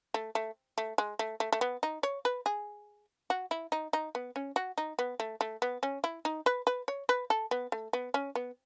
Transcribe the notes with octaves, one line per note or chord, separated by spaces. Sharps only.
A3
A3
A3
G#3
A3
A3
A3
B3
D#4
C#5
B4
G#4
F#4
E4
D#4
D#4
B3
C#4
F#4
D#4
B3
A3
A3
B3
C#4
E4
D#4
B4
B4
C#5
B4
A4
B3
A3
B3
C#4
B3